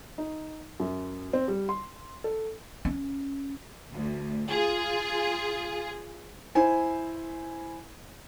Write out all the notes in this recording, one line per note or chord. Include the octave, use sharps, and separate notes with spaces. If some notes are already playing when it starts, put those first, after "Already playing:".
D#4
F#2
C4
G3
C6
A4
C#4
D2
F4 G#4
E4 C5 G#5